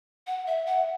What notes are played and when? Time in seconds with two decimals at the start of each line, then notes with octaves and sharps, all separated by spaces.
0.27 F#5
0.46 E5
0.66 F#5